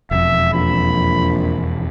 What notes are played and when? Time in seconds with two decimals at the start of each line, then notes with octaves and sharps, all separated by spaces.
0.11 E1 F2 E5
0.53 A#1 B5